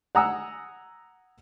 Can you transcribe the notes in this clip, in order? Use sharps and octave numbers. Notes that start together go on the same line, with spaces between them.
F#5 G#5 A#5 D#6 E6